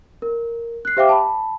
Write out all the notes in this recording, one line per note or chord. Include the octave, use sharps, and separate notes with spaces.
A#4
F#6 C7
G4 C5 E5 F5 G5 D6
A5 B5